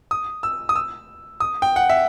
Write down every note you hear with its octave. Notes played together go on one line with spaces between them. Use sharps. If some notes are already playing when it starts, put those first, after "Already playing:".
D#6
E6
D#6
E6
D#6
G5
F#5
E5